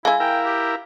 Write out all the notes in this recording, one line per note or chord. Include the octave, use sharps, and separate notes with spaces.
G#3 E4 F5 G#5
E4 A#4 G5
G4